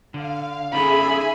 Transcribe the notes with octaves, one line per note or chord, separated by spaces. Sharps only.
D3 F5
C#4 D#4 G#4 A4 E5 G#5 B5